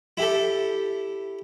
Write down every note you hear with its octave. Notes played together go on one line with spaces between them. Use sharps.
E4 G4 A4